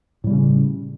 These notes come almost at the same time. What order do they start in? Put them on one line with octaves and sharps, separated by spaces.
A2 G3 C#3 C#4